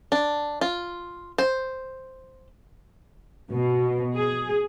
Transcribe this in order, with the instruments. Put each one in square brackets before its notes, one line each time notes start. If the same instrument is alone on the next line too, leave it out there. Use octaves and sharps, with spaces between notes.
[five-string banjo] D4
F4
C5
[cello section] B2
G#4